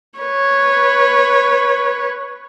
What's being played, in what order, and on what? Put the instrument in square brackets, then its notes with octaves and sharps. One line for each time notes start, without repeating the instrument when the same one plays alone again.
[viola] B4 C#5